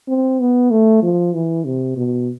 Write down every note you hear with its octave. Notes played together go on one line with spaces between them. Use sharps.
C4
B3
A3
F3
E3
C3
B2